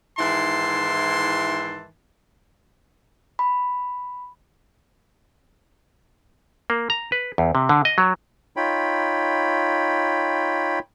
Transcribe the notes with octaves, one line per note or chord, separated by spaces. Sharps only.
G#2 D#3 E3 E4 A5 C6
B5
A#3
A#5
B4
E2
C3
D3
D#5
F#3
D#4 F4 C#5 G5 B5